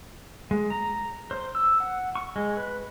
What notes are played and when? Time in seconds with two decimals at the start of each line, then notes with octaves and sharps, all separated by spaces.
0.51 G#3
0.70 A#5
1.31 C5
1.55 E6
1.80 F#5
2.15 C#6
2.36 G#3
2.57 B4